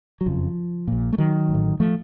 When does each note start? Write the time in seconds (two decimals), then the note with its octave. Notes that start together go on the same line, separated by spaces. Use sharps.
0.21 F#3
0.26 F#1 F2 C#3 F3
0.88 A#1 A#2
1.13 A3
1.18 D#3 F#3
1.49 A1 A2
1.80 F3 A3